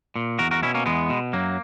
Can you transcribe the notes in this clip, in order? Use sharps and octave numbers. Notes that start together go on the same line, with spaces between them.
A#2
E2 F#4 A#4
F#4 A#4
B2 C#4 E4
A#3 C#4
E2 G#3 B3
B2
F#2 F#3 A#3